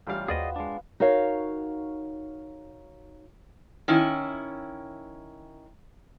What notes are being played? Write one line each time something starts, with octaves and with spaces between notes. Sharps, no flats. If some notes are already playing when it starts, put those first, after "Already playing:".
A1 G3 F4 C#5 F5 G5
D#2 B3 F#4 G#4 C5 D5 D#5 F5
G#3 D4
D#4 F#4 A#4 C#5 F5
D#3 C#4 E4